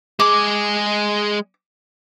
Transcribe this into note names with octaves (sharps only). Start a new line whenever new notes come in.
G#3 G#4 D6